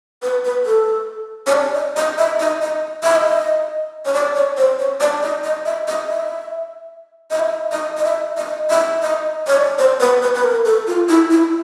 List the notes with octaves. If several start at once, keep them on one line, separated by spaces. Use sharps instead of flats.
B4
B4
A4
C#5
D5
D#5
D#5
E5
D#5
D#5
E5
D#5
C#5
D5
C#5
C5
C#5
D5
D#5
D#5
E5
D#5
E5
D#5
E5
D#5
D#5
E5
D#5
E5
D#5
C#5
D5
C5
B4
B4
B4
A#4
A4
F4
E4
E4